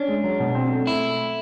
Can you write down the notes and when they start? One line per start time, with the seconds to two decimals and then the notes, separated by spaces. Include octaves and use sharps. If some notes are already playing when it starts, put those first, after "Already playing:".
Already playing: C#4 D4
0.08 G#3
0.24 F#3
0.40 B2
0.55 C4
0.71 A3
0.87 A3 E4